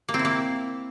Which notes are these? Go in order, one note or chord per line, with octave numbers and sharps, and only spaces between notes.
A#3
C4
E4
A#3